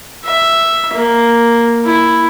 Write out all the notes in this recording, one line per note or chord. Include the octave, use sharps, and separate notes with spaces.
E5
A#3
E4